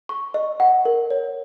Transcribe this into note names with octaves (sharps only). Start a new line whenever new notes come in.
C#6
D#5
F#5
A#4
C#5